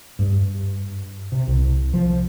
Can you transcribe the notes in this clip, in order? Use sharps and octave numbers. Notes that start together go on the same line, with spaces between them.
G2
C3
C2
F3